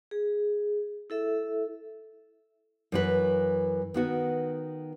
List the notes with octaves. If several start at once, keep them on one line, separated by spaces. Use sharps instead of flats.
G#4
E4 A4 E5
F#2 E3 B4
D#3 B3 F#4